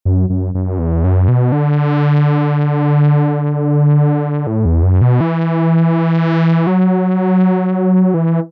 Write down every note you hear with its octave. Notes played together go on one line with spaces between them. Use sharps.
F#2
F#2
F#2
E2
F#2
B2
D3
A2
E2
F#2
B2
E3
F#3
E3